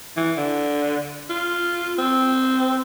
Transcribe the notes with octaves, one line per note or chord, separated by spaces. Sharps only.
E3
D3
F4
C4